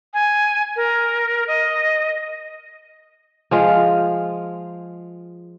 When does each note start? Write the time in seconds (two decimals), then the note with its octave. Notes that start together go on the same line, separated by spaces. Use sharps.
0.14 G#5
0.76 A#4
1.48 D#5
3.51 F3 G#3 F4